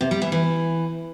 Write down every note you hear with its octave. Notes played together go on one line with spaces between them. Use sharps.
C3
G3
E3
E3